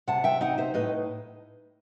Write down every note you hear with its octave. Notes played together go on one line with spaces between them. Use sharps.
C3 F#5 A5
E5 G5
D#4 D#5 F#5
C5 E5
A2 B4 D#5